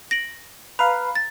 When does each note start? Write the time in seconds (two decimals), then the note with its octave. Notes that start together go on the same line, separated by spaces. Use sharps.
0.11 A#6 D7 F#7
0.79 B4 F5 A#5
1.15 A6